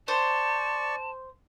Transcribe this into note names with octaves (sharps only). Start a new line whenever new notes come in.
C5 D5 A5 C#6